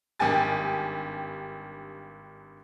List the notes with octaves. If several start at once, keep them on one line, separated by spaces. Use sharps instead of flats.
G#1 G2 G4 G5 G#5 A6